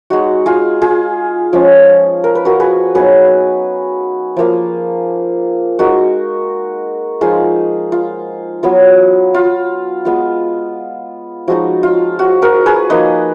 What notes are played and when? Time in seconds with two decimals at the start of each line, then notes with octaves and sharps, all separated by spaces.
0.10 G#3 D#4 F#4
0.46 F4 G#4
0.82 F4 G#4
1.53 F3 G#3 C#4 F4
2.24 A#4
2.35 B4
2.45 F#4 A#4
2.60 G#4 B4
2.95 F#3 B3 D#4 G#4 B4
4.37 F3 A#3 F4
5.79 G#3 D#4 F#4 A#4
7.21 F3 G#3 D#4 F4 G#4
7.92 F4
8.63 F#3 B3 F4
9.34 F4
10.05 G#3 B3 F4
11.48 F3 G#3 D#4 F#4
11.83 F4
12.19 F#4
12.42 F#4 A#4
12.66 G#4 B4
12.90 F3 A#3 D#4 B4 D#5